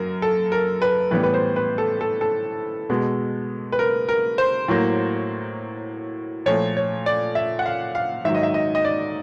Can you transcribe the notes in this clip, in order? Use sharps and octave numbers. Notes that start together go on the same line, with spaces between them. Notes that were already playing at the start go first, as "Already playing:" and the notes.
Already playing: F#2 A#4
A4
A#4
B4
A2 E3 G3 B3 B4
B4
C5
B4
A4
A4
A4
B2 G#3 B3
B4
A#4
A#4
C5
A2 F#3 A#3
A#2 F3 A3 C#5
C#5
D5
E5
F#5
F5
F5
G#2 D#3 F#3 E5
D#5
E5
D#5
D#5
D5